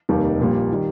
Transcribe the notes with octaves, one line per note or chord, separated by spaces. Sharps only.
F1 D#2 D#3 G3
A#1 A#2 G3
D#3 G3